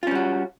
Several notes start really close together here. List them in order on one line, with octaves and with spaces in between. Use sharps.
F4 C#4 G3 F#4